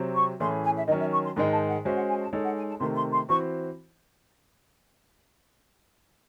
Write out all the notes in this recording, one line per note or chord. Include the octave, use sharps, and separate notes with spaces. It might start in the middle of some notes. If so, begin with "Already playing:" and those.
Already playing: C3 F#3 C4
C#6
A2 E3 A3 C#4 G#4 C6
G#5
E5
D#3 F#3 C#4 D#5
E5
C#6
C6
G#2 D#3 G#3 D#4 C6
A5
F#5
G#3 C#4 F#4 C5 E5
F#5
G#5
A5
G#3 D#4 A4 C#5
F#5
G#5
A5
C3 D#3 A3 C6
C6
C6
E3 C4 F#4 C5 C#6